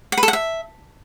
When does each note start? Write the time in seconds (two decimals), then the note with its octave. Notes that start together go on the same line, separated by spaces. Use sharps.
0.12 F#5
0.18 B4
0.23 A4
0.28 F#5
0.33 E5